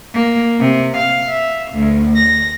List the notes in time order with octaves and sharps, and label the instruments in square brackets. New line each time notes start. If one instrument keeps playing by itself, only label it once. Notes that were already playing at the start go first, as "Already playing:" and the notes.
[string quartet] A#3
C3
F5
E5
D2
A#6